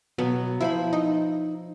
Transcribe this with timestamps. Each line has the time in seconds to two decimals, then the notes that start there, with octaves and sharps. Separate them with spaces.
0.18 B2 F#3 B3
0.61 F3 E4 C5 B5
0.93 D#4